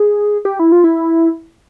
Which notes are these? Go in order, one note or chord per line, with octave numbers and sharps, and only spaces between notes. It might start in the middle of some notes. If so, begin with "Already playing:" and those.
Already playing: G#4
G4
E4
F4
E4